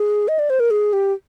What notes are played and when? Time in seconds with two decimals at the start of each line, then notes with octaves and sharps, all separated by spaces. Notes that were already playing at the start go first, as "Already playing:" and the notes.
Already playing: G#4
0.28 D#5
0.39 D5
0.50 C5
0.60 A#4
0.71 G#4
0.93 G4